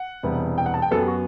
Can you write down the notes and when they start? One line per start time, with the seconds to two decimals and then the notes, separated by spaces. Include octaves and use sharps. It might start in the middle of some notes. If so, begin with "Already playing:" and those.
Already playing: F#5
0.23 E1 E2 C3 G3 B3
0.58 G5
0.66 F#5
0.74 A5
0.82 G5
0.91 F#2 F#3 B3 A4
1.00 G4
1.08 F#4